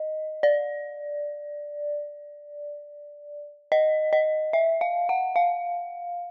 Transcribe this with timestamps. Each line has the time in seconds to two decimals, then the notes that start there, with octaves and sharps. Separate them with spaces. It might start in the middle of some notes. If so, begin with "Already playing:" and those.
Already playing: D#5
0.43 D5
3.72 D#5
4.13 D#5
4.53 E5
4.81 F5
5.09 F#5
5.36 F5